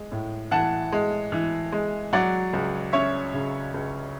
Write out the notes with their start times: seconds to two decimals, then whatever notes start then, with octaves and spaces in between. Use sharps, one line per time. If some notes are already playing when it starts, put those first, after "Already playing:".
Already playing: G#3
0.12 A2
0.51 E3 F#5 A5
0.92 G#3
1.32 E3
1.72 G#3
2.13 F#3 D5 F#5
2.53 C#2
2.93 C#4 C#5 E5
3.33 C#3
3.74 C#2